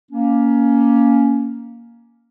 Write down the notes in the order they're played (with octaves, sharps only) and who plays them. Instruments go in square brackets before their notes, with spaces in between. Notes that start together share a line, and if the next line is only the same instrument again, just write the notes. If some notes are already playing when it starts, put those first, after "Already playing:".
[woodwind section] A#3 C#4